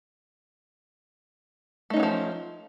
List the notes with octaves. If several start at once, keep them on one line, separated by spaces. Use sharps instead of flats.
F3 F#3 A3 C#4 D#4